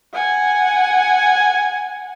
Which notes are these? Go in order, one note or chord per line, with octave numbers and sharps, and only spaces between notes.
F#5 G#5